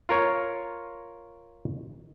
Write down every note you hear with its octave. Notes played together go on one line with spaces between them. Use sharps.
F4 A#4 C#5